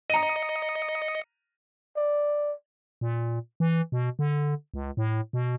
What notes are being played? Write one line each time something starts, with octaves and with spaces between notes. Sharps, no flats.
D#5 A#5 C#7 D#7
D5
A#2
E3
B2
D3
C#2
A2
B2